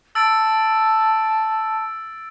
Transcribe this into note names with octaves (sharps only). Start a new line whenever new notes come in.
A5 E6 A6 D7